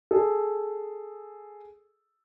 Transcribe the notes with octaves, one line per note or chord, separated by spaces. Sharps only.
G#4 A4